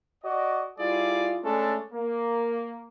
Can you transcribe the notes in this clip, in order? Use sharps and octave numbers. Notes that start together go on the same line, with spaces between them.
F#4 D5 D#5
G3 E4 F4 G#4 D5
G#3 A3 C#4 D4 A4
A#3